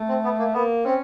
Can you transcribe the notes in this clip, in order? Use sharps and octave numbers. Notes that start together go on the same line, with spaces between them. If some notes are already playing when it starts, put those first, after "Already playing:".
Already playing: A3
C4
B3
A#3
A#3 B3
C4 C#4